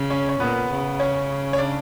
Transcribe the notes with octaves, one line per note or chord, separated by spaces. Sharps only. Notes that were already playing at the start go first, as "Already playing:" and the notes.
Already playing: C#3
C#4 C#5
C#5
A#2 B3 B4
C#3
C#4 C#5
C#5
D4 D5